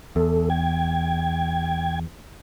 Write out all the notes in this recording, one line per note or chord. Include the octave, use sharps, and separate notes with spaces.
E2 A4
G5 G#6